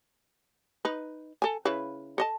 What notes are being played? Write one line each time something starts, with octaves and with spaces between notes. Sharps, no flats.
D#4 B4
A4 G#5
C#3 E4 B4
A4 D#5 A5